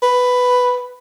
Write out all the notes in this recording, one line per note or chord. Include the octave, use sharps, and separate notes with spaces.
B4